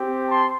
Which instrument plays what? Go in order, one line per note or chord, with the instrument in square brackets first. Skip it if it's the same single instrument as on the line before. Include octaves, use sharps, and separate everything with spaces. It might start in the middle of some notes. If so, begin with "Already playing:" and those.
Already playing: [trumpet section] C4 G4
A5 C6